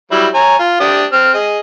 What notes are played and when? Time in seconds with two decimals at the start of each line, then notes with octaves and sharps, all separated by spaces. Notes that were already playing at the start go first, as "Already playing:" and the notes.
0.11 F#3 G3 E4
0.34 C#5 G#5 A#5
0.59 F4
0.80 D4 G4 D#6
1.13 C4 F6
1.34 G#4 D#5